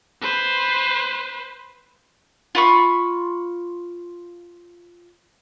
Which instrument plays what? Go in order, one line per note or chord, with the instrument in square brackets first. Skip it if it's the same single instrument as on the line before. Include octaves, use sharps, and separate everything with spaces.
[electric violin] B4 C5
[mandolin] F4 B5 C#6